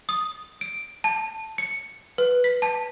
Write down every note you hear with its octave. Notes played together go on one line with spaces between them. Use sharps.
D#6
D7
A5
C#7
B4
B6
A5